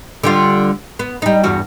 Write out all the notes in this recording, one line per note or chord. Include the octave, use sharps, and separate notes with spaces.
D3 G3 F4
B3
G3 D#4
E2 G2 F#4